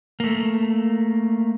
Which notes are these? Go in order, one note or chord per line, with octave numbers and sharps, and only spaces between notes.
A3 A#3